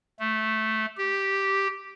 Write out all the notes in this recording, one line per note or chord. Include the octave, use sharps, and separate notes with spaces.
A3
G4